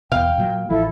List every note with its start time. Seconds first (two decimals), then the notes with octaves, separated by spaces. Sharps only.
0.12 E2 B2 F5 G5
0.38 A#2 F#3
0.70 A1 E3 F3 E4 A4